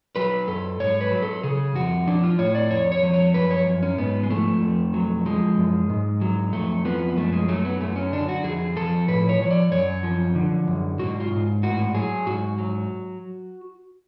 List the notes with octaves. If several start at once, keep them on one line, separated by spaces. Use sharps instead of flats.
F#3 B4
F#2 A4
G#2 C#5
B4
F#3
A4
C#3 G#4
F2 F#4
F3 D4
F4
A2 C#5
D5
F2 C#5
C#5
F3
C#5
F#2 B4
C#5
F#2
C#4
G#2 B3
G#3
F3 A3
F2
F#3
F3 G#3
F#2
G#2
F#3
F2 A3
F3 B3
F#2 A3
G#3
F#3 A3
B3
F#2 A3
C#4
D3 D4
F#4
F2 G#4
F3 A4
A2 B4
C#5
F3 C#5
D5
F#2 C#5
F3
D3
F#2
G#2 F#4
F4
G#2
A2 F#4
F#3 G#4
G#2 F#4
F#3